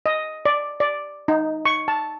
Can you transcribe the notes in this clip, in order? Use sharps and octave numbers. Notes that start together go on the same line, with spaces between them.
D#5
D5
D5
D#4
C#6
A5